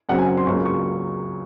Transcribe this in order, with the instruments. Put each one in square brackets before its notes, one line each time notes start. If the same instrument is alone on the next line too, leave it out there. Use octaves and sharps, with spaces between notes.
[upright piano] F#2 C#3 F#3 C4 F#5
G#5
C6
C#2 C#3 F#3 A#3 C#6
C#6